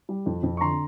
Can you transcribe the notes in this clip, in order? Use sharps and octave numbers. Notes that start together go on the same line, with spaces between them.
G3
F2
F2
C#6
D3 A#5 C6